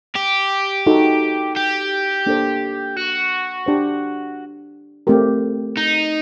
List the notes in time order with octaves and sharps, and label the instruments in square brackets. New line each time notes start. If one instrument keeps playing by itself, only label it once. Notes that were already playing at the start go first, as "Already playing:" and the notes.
[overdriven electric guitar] G4
[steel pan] D#4 F#4 A4
[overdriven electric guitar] G4
[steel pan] A#3 D4 A4 C5
[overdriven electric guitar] F#4
[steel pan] D4 G4 C5 G5
A3 C4 G4 A#4
[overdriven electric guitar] D#4